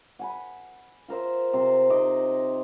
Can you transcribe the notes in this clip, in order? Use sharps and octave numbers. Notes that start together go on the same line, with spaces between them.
F#5 G#5 B5
F4 A#4 C5 E5
C3 C5
C3 D#4 D#5 D6